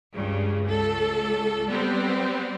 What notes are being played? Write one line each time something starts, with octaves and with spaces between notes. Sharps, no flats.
C#2 G2 C#3
C#2 A4
G3 B3 C4